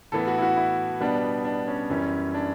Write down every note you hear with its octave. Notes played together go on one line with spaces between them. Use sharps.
A2 E3 B3 A4
F#4
E4
F#4
E4
B2 G3 B3 D4
D4
C#4
F#2 E3 G3 C#4
D4